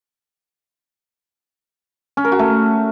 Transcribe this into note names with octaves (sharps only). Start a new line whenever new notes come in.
C#4
A#4
F#4
A3